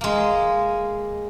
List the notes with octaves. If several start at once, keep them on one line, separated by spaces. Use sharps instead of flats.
G#3 A#3